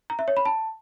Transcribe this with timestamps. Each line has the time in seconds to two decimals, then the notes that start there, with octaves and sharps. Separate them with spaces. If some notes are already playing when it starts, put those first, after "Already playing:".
0.10 A#5
0.19 E5
0.28 C#5
0.37 B5
0.46 A5